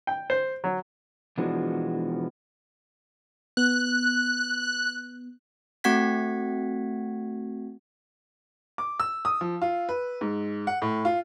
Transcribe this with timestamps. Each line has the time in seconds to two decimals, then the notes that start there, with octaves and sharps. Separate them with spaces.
0.07 G5
0.30 C5
0.64 F#3
1.38 B2 E3 F3 G#3 D4 F#4
3.57 B3 F#6
5.84 A3 C4 F#4 F#5 G#6 B6
8.78 D6
9.00 E6
9.25 D#6
9.41 F3
9.62 F4
9.89 B4
10.21 G#2
10.67 F#5
10.82 A2
11.05 F4